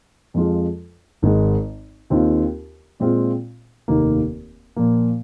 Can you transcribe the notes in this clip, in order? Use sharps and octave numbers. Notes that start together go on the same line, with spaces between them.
F2 F3 G#3 F4
G#1 G#2 D#3 G#3
D#2 D#3 C4 F4
A#2 G#3 C4 F4
F1 D#2 D#3 A#3
A#2 F3 A#3